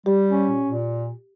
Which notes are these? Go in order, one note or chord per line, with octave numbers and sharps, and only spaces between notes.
G3 G4
C#4
A#2
A#2